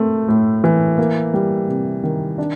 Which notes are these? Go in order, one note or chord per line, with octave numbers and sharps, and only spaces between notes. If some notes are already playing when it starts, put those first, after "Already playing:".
Already playing: A3 C4
A2
E3
A#3
G3
C3
D#3
D4